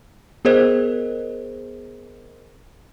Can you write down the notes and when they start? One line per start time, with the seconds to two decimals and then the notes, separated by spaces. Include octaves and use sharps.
0.45 B3 G#4 A#4 C5 D#5